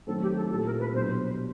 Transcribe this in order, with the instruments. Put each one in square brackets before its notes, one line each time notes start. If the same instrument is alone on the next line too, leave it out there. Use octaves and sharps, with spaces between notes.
[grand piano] D#3 F#3 A3 C4 [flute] A4
[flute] G4
A4
[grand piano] A#2 G3 C4 E4 [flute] A4
[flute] A#4
B4
[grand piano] B2 F#3 B3 D4 G4 [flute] C5